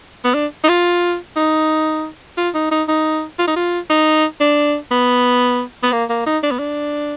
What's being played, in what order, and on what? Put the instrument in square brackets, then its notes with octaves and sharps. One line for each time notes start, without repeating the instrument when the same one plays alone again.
[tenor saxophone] B3
D4
D#4
F4
D#4
F4
D#4
D#4
D#4
F4
D#4
F4
D#4
D4
B3
B3
A#3
A#3
D#4
D4
B3
D4